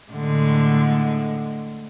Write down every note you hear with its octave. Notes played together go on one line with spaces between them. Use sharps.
A2 D3 G#3